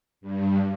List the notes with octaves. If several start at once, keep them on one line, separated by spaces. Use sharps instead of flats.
G2